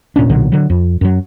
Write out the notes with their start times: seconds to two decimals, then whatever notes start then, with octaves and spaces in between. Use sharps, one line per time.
0.16 E1 A#2 C#4 D4
0.30 B1 A#2 D3 F#3
0.52 D3 F#3
0.70 F2
1.01 F#2 F#3